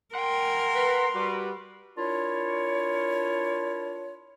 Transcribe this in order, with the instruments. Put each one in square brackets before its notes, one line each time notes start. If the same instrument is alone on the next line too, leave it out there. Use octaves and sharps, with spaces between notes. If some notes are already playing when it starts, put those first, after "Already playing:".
[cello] A#4 [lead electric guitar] F#5 G5 [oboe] C6
[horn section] B4 A#5
G3 F#4 B4
[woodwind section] D4 E4 F4 A#4 C#5